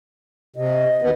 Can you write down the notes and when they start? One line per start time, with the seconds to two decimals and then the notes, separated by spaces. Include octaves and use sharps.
0.56 C3 D#5
1.02 D#2 B3